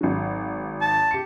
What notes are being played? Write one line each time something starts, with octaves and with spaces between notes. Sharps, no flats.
G#1 F#3
A5
G4 C#7